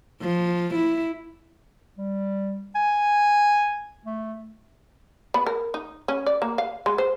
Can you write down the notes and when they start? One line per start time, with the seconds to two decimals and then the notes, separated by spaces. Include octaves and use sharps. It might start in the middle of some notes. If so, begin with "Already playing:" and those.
0.22 F3
0.75 E4
1.98 G3
2.75 G#5
4.05 A3
5.34 B3
5.46 A#4
5.74 D#4
6.08 C#4
6.27 D5
6.42 A#3
6.58 F5
6.86 G#3
6.98 C5